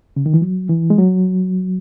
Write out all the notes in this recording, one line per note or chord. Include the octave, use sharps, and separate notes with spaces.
C#3
D#3
E3
F#3
E3
G#3
F#3